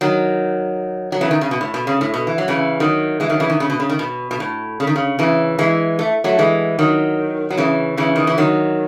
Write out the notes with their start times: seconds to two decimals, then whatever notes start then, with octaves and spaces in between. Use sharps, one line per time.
0.01 D#3 F#3
1.12 F#3
1.21 C#3 E3
1.31 D#3
1.41 C#3
1.51 B2
1.61 A2
1.74 B2
1.87 C#3
2.01 A2
2.14 B2
2.27 E3
2.38 F#3
2.48 C#3 E3
2.80 D#3 F#3
3.20 E3 G#3
3.29 D#3 F#3
3.40 C#3 E3
3.50 D#3
3.60 C#3
3.70 B2
3.80 C#3
3.89 D#3
3.99 B2
4.31 B2
4.40 A2
4.80 C#3
4.87 D#3
4.96 C#3
5.19 C#3 E3
5.59 E3 G#3
5.99 A3
6.24 F#3 A3
6.39 E3 G#3
6.79 D#3 F#3
7.50 F#3
7.57 C#3 E3
7.97 C#3 E3
8.16 D#3
8.27 E3
8.38 D#3 F#3